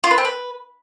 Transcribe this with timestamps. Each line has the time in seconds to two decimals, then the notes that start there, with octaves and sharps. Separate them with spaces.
0.04 F4
0.11 B4
0.18 C4
0.25 B4